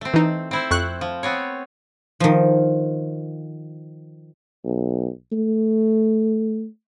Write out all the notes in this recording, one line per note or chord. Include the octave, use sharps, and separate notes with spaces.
A3 C4
E3 D#4
C4 E4 C5
F2 C#6 F#6
F3
B3 C4 C#5
D#3 F3
B1
A3